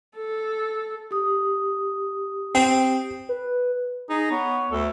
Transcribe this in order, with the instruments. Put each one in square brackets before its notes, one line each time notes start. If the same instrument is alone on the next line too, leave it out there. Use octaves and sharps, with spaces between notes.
[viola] A4
[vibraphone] G4 D#6
[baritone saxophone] C4 [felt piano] G5
[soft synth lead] B4
[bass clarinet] D#4 [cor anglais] G#4
[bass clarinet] B3 [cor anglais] C#5
[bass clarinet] D2 [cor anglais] A4